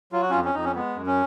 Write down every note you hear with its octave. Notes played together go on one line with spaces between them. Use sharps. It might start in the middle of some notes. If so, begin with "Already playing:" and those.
F#3 F4
F#4
F2 C#4 F4
C#4
F2 D#4
C#4
G#3 B3
F#2
C#4